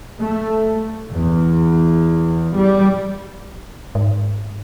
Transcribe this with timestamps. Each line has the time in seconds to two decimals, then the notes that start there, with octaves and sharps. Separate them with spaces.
0.19 A3
1.11 E2
2.56 G3
3.95 G#2